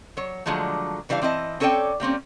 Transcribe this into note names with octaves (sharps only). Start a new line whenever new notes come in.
F#3 C#5
D3 F3 F#3 G#3 A3
C#3 E3 G3 D4 F5
E3 C4 E4 D#5 A5
C4 C#4 A4 C#5 D5 G5
G3 A#3 C4 C#4